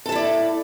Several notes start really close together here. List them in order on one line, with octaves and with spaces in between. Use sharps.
A4 A5 E4 D5